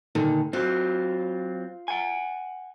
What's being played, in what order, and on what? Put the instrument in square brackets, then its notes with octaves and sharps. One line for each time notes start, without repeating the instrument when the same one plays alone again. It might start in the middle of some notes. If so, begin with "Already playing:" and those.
[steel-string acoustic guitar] A#2 D3 D#3
[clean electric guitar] F#3 C4 [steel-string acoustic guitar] F4
[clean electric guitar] F#5 G#5